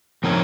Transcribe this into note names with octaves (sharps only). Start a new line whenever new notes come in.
F3 C4 D#4 A#4 C#5